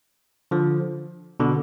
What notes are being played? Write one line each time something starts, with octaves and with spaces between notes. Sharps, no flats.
D3 F3
B2 D3